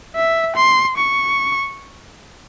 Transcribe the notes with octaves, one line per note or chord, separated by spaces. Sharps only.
E5
C6
C#6